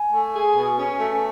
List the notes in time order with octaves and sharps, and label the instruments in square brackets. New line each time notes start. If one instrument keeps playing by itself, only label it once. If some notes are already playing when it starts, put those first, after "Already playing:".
Already playing: [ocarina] G#5
[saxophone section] A3
G#4
B2
C#4
A3